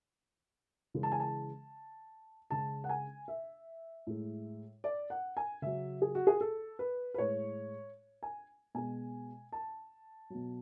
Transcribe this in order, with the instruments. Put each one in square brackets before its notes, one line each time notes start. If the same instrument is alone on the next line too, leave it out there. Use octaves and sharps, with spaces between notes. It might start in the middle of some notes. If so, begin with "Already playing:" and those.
[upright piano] C#3 E3 G#3
A5
G#5
A5
C#3 G#3 A5
F#5
G#5
E5
A2 G#3
D5
F#5
G#5
C#3 F#3 E5
G#4
F#4
G#4
A4
B4
B4
A2 G#3 C#5
G#5
B2 G#3 G#5
A5
B2 F#3